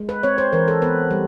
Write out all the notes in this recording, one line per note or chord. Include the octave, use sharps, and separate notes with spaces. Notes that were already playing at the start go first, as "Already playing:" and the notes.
Already playing: G#3
B4
C4 C#5
C5
E3 A#4
A4
B3 B4
G3